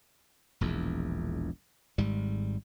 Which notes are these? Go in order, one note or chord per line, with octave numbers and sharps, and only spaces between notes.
E1 A#1 E2
G#1 G#2 G3